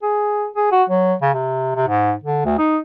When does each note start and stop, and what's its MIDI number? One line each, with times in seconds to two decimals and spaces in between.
0.03 0.46 68
0.56 0.69 68
0.72 0.83 66
0.90 1.14 54
1.22 1.31 49
1.34 1.71 48
1.75 1.85 48
1.88 2.13 44
2.24 2.43 50
2.45 2.54 38
2.58 2.78 63